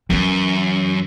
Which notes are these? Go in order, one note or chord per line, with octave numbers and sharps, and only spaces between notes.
F#2 E3 C#4